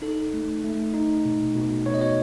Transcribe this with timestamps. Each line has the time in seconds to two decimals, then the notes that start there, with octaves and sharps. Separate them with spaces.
0.02 D#4 A4
0.34 A3
0.64 A3
0.94 D#4
1.25 B2
1.55 B2
1.86 B2 C#5
1.94 D#5
2.01 C#5